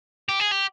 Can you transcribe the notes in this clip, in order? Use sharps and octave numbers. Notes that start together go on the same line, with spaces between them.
G4
G#4
G4